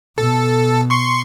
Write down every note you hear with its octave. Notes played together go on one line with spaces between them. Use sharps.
B2 A4
C6 C#6